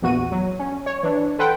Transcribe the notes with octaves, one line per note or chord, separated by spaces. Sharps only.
A#1 E2 F#4 D#7
F#3
C#4
C#5
E3 D4
A4 B4 C5 F#5 G5